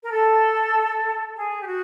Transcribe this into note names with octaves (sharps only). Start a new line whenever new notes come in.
A#4
A4
G#4
G4
F#4